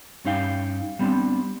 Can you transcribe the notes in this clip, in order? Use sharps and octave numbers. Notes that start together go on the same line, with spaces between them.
G2 C#4 D#4 F5 G5
G3 B3 C4 D4